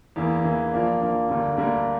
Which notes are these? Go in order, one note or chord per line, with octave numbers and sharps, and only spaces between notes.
E2 E3 A#3
E2 E3 A#3
F3 A#3 D4
F3 A#3 D4
D2 D3 G3 A#3
D2 D3 G3 A#3